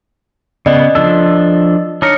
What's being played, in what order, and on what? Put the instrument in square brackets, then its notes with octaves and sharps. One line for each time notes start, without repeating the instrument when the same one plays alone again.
[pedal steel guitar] C#3 B3 [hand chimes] D5 D#5
[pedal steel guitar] F3 D4 A4
[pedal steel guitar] D4 D#4 A#4 [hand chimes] C#5 C#7